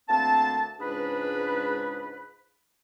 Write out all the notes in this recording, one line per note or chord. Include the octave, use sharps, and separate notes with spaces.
D2 A#3 C4 A5
C#2 G#2 D4 G#4 B4